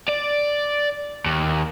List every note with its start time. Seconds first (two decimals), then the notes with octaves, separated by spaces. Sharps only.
0.08 D5
1.26 D#2